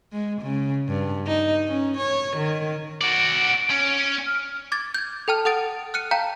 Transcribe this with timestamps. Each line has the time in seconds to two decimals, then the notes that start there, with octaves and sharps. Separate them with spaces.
0.12 G#3
0.41 C#3
0.88 G2
1.27 D#4
1.68 C#4
1.98 C#5
2.37 D#3
3.01 F#4 D5 D7
3.70 C#4
4.26 F6
4.72 D6 G#6 A6
4.94 G6 G#6
5.28 A4 G5 A5 F6
5.45 A4 F#5 D#6 A6 D7
5.94 F6 F#6 C#7 D#7
6.11 F5 G5 A5 A#5 G6